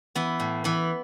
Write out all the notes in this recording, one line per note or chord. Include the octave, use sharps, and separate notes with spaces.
E3 B3
A2
E3 B3